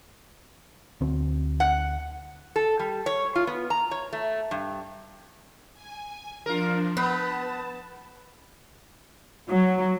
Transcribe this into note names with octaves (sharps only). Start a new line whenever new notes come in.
D2 C4
F#5
A4
G3
C#5
F4
B3
A#5
C#5
A3
G2
G#5
F3 D4 F4 A#4
B3 B4 A5
F#3